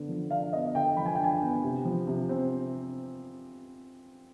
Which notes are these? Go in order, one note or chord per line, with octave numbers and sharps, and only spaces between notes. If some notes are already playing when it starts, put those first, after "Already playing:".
Already playing: D3 B3 D4
F3
D4 F5
B3 D#5
D3 G5
F3 B5
G#5
G5
D4 G#5
B3
C3
F3
C3
C4